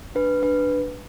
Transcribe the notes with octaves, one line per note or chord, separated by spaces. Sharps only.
D4 B4
D4 B4